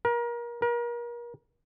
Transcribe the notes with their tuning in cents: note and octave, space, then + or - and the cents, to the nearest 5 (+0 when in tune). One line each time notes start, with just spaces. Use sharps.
A#4 +30
A#4 +35